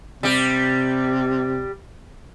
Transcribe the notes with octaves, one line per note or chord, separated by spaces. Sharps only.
C3 G3 G4